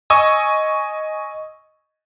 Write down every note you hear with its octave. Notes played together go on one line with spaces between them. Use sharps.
D#5 G#5 C#6 D#6 E6